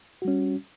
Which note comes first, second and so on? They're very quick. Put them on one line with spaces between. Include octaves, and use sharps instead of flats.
F#4 G3 C#4